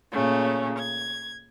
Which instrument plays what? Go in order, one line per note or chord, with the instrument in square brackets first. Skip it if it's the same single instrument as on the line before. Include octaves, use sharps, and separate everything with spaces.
[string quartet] A#2 C#3 A3 C#4
G#6